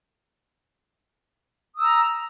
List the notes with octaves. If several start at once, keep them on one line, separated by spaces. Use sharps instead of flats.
A#5 D#6 E6